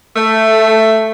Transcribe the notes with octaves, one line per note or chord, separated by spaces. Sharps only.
A3